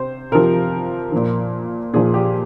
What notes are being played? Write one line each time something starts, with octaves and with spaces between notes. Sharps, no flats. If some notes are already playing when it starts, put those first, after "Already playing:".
Already playing: C3 C5
C3 F3 A#4
A#2 F3
A#2 F3 G#4
G4